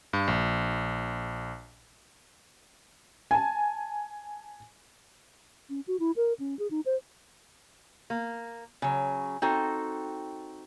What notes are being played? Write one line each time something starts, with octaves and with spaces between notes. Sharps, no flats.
G2
A#1
G#5 A5
C#4
F#4
E4
A#4
C#4
G#4
D#4
C5
A#3
C#3 F#3
C4 D#4 F#4 A4